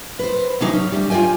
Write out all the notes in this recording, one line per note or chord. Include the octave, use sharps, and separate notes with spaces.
B4 C5
C3 E3 F#3 D4 D#4
C#4
D2 C3 G3 D5
F4 D5 D#5 G5 G#5